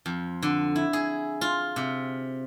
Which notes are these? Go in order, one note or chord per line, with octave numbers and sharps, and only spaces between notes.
F2
D3
E4
G#4
F4
C3